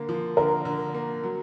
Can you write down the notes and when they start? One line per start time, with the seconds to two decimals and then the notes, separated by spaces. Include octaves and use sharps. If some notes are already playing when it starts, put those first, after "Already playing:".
Already playing: D3 A#3
0.09 F3
0.37 D3 A#4
0.65 D3
0.95 A#3
1.23 F#3